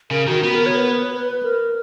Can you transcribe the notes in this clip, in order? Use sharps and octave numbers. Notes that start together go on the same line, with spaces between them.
C#3 A#4
D#3 F#4
B3 F#4
A#4
C#5
B4
A#4